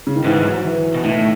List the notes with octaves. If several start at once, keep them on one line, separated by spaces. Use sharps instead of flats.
C#3
D#3
G#2 E3
F#3
E3
B2
A2 D#3